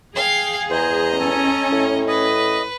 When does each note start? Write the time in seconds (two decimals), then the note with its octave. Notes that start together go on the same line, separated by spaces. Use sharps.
0.16 G#4 F5 G5
0.70 E2 C5 D#5 A#5
1.20 C#4 A4 G#5
1.72 A2
2.08 B4 D#5